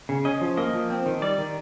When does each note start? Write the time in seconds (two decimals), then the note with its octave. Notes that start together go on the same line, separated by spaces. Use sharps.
0.09 C#3
0.25 C#4 D#5
0.41 F3
0.58 A#3 D#5
0.73 F3
0.90 C4
1.06 D#3
1.22 G3 D5
1.38 D#3